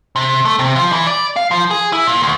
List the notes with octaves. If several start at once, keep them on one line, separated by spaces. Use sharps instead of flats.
C3
A3
C3
F3
E3
D5
F5
F3
G#4
E4
A#2
D2